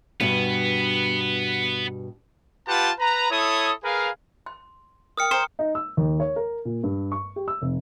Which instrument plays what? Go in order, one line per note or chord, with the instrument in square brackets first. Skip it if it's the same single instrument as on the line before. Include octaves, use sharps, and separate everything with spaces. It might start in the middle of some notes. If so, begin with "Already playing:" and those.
[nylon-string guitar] G2 B2 [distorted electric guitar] B3
[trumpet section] F4 G4 B4 F#5 A5
B4 A#5
E4 A4 C#5 D#6
G#4 A#4 B4 F5
[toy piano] C6
[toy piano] A#4 G5 [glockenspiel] D#6 F6 C#7
[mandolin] C5 [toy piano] G5 A#5 C6
[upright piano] D#4
E6
D#2
C#5
A#4
A#2
G2
C#6
G4
E6
F1